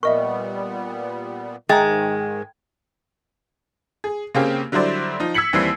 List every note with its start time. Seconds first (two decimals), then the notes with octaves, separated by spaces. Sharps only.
0.03 A#2 G3 B3 A#4 D#5 E5 C#6
1.69 G#2 D#3 G#3 G5 A#5 A6
4.04 G#4
4.35 C#3 A#3 C4 C#4 G4 G#4
4.72 D3 F#3 G3 E4 C5 D5
5.20 F3 D#4
5.34 E6 G#6 B6 C#7 F#7
5.53 D#2 E3 G3 C4 C7